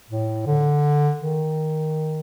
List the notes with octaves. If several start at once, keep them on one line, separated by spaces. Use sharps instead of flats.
A2
D3
D#3